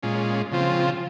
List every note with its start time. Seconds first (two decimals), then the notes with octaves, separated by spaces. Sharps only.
0.03 A#2 G#3 C#4 F4
0.52 C#3 F3 C4 F4